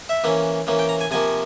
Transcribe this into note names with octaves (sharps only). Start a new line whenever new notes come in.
E5
E3 A#3 C#4
E3 A#3 C#4
G5
A#5
G#5
C3 F3 A#3 G#5